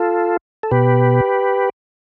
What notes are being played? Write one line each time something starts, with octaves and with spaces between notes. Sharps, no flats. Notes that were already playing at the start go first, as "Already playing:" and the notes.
Already playing: F4 A4
A4
B2 G4 B4